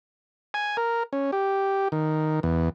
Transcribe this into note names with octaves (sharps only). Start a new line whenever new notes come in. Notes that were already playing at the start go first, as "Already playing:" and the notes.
G#5
A#4
C#4
G4
D#3
E2